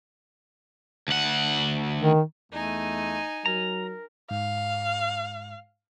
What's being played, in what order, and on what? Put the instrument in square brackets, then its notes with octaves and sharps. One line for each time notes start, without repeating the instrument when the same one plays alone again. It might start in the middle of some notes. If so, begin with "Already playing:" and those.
[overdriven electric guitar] D2 F#5
[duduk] D#3
[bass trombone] E2 [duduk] A3 [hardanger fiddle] D#4 G#5
[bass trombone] F#3 [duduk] A#4 [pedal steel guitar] A#5
[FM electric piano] G#2 [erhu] F5